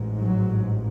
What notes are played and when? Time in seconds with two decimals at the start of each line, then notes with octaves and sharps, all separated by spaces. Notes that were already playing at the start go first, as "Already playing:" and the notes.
Already playing: A1 G#2
0.20 F#3